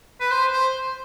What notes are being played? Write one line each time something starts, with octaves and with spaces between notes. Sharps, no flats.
B4
C5
C5